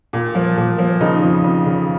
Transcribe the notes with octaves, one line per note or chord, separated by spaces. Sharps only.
A#2
F3
A#2
F3
C#3 D#4 D#5
F2
F2
C#3